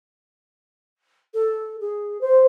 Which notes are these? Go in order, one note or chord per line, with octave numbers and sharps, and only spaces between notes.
A4
G#4
C5